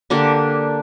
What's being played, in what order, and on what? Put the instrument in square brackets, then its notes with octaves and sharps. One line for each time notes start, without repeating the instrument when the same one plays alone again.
[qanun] D3 A#3 D4 G4